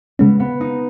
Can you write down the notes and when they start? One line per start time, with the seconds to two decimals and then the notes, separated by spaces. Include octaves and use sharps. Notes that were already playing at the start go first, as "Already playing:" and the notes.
0.19 C#3 G#3 B3 C#4
0.40 B3
0.61 D#4